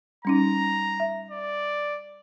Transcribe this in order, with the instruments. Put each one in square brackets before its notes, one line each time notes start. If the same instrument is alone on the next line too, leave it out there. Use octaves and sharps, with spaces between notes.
[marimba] G3 C#4 D#4 [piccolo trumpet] A#5
[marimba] E5
[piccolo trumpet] D5